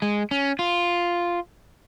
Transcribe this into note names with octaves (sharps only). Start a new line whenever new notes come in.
G#3
C#4
F4